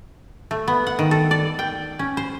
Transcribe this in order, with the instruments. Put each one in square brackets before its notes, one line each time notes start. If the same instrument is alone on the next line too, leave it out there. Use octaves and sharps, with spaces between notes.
[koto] A3
B3
F#5
D#3
A4
D5
G5
C#4
C5